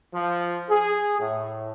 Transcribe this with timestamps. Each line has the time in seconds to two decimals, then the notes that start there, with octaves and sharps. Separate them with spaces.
0.13 F3
0.70 G#4
1.19 A2